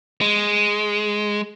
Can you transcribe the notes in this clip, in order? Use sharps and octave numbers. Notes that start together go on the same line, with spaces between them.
G#3